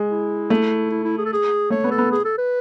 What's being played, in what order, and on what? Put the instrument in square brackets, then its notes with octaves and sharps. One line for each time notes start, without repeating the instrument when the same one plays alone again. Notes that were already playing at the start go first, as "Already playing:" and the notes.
Already playing: [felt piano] G#3
[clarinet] E4
[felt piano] A3
[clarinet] E4
E4
G#4
A4
G#4
[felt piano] A3 [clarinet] C#5
[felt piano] B3
[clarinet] A4
[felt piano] B3
[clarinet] G#4
A4
B4